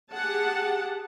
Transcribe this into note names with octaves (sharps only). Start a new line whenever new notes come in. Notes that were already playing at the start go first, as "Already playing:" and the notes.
G4 G#4 F#5 A5